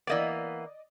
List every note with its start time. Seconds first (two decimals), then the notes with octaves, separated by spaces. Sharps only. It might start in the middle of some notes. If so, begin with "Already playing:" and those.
0.07 E3 A#3 B3 D5 D#5